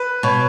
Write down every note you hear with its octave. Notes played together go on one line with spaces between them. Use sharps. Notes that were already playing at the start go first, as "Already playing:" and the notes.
Already playing: B4
B2 C#5